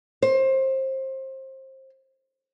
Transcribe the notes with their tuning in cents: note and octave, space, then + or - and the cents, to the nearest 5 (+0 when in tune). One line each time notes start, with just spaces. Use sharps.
C5 +25